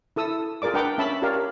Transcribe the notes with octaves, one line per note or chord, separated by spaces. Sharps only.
E4 A4 D#6 E6
F4 G#4 A#4 D5 D6
D4 B4 F#5 G5 A#5 D6
C#4 E5 A5 B5 E6
F4 G4 A#4 C#5 D5 F5